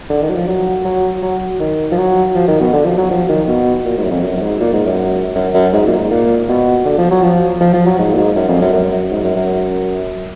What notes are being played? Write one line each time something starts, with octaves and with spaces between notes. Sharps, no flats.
D3
D#3
F#3
F3
F#3
F#3
F#3
D#3
F3
F#3
F3
D#3
B2
D3
F3
F#3
F3
D#3
B2
A#2
G#2
F#2
F2
F#2
F#2
G#2
A#2
G#2
F#2
F#2
F#2
G#2
A#2
G#2
A#2
B2
D3
F3
F#3
F3
F3
F3
F#3
G#2
A#2
G#2
F#2
F2
F#2
F#2
G#2
F#2
F#2